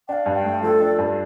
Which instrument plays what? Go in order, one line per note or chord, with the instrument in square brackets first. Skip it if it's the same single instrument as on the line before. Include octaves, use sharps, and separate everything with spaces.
[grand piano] D4 [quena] F5 G5
[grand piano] G2
[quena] G5
[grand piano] A3
[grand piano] F3 [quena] A4
[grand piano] D4
G2